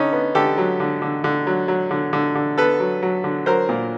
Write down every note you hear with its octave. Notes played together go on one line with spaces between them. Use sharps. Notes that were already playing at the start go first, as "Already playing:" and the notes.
Already playing: D3 C#4 D#4
B3
D3 G4 A4
F#3
D3
D3
D3
F#3
F#3
D3
D3
D3
B3 A4 B4
F#3
F#3
D3
F#3 A#4 C5
A#2